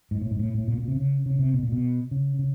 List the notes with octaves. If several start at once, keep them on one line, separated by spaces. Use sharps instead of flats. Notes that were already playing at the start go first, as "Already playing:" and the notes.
G#2
A2
G#2
A2
A2
A#2
A#2
C3
C#3
C#3
C3
B2
A#2
B2
C#3
C#3